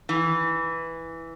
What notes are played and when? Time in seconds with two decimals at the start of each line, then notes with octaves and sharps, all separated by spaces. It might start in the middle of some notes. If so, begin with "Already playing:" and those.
0.09 E3